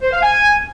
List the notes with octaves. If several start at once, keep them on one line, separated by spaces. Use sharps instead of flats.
C5
F5
G#5